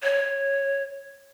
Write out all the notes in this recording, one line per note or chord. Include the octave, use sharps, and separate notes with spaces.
C#5